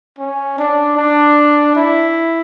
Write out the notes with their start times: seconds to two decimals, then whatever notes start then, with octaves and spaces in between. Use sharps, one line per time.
0.19 C#4
0.58 D4
0.98 D4
1.76 E4